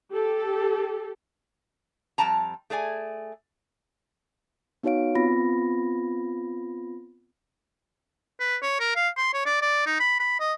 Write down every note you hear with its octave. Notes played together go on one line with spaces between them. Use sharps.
G4 A4
F2 G3 G5 A5 A#5
A3 G#4 D5 G#5
B3 D#4 F#4 C#5 F5 D7
B3 C4 F4 B5 A#6
B4
C#5
A#4
F5
C6
C#5
D5
D5
D#4
B5
B5
D#5